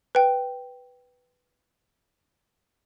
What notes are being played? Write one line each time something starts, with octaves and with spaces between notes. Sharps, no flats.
B4 G5